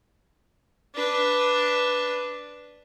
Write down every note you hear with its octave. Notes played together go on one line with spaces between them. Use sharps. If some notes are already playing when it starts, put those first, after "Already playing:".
D4 B4